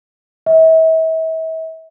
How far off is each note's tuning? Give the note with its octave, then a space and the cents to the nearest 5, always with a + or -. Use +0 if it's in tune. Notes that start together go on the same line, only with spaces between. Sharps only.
E5 -40